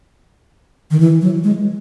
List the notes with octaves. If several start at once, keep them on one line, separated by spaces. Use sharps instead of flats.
D#3
E3
F#3
G#3